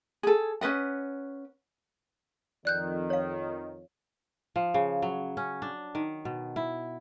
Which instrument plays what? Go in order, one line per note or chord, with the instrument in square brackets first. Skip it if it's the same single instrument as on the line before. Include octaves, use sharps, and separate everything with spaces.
[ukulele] G#4 A4
C#4 B4 D#5 F#5
[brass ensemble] F2 D#3 [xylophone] D5 F#6 G6
[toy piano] C#5 F5
[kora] F3
C#3
F#3
C#4
D4
D#3
B2
E4